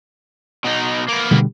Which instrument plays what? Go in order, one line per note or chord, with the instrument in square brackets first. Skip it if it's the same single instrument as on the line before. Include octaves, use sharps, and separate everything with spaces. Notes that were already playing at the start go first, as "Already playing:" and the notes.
[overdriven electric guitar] B2 D#4
A#3 B3
[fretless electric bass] B2 D3 G3